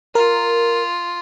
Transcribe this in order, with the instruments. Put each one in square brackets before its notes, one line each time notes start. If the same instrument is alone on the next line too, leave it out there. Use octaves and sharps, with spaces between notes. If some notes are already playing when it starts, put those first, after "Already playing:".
[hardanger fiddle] F4 [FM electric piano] A#4